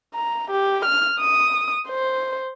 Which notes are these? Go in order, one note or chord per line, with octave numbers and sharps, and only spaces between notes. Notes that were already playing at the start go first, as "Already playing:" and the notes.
A#5
G4
F6
D#6
C5